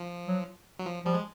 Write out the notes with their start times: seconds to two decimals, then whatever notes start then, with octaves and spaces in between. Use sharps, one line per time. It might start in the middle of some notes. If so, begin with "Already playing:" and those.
Already playing: F3
0.27 F#3
0.79 F#3
0.86 F3
1.05 F3 G3
1.14 G#3